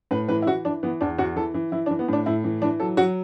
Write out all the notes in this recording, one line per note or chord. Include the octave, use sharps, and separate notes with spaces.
A2 B4
E3 B4
E4
E3 F#4
E3 D4
E3 B3
E2 D4
E2 F#4
E3 A4
E3
E3 E4
D4
E3
B3
A2 D4
A2 E4
E3
E3 D4
F#3 A4
F#3 F#4